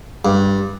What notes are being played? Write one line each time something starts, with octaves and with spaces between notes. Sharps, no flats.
G2